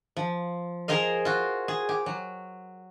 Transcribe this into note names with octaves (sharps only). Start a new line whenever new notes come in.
F3
G#4 A#4 C5 D#5 F5
F4 F#4
G#4
G4
F#3